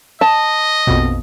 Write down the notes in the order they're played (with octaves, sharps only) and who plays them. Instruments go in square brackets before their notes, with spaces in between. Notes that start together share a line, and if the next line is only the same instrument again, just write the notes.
[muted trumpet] D#5 [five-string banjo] A5
[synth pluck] A#1 F2 B2